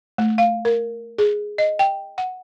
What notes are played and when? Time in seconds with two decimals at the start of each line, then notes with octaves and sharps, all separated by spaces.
0.18 A3
0.38 F5
0.65 A#4
1.18 G#4
1.58 D#5
1.79 G5
2.18 F#5